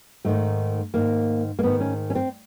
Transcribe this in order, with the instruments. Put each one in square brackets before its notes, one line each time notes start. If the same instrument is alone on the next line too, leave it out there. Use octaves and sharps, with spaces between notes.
[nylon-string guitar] G#2 D#3 A3
G#2 D#3 A#3
A#3
G#2 D#3 B3
C#4
C#4
C4